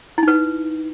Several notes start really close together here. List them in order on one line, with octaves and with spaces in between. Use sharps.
E4 D#4 B4